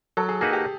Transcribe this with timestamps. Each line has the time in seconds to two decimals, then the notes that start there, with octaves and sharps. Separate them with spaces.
0.17 F#3 A4
0.29 G#4
0.41 A#3 D#4 F#4 G#4 B4
0.53 G4